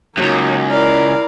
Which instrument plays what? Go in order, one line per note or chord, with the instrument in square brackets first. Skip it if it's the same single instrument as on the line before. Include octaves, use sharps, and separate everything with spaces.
[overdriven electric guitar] C#2 F#2 [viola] F#3 D#4 [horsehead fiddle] A#3
[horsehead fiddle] E4 A#4 [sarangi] D5 [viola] F5